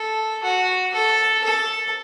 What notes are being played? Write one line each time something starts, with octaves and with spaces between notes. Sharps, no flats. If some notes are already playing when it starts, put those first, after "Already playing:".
Already playing: A4
F#4
A4
A4